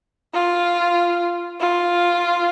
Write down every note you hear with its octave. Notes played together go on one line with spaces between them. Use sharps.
F4
F4